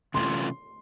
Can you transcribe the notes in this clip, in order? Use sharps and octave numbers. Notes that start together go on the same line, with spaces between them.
C3 E3 A3 C#4 F4 C6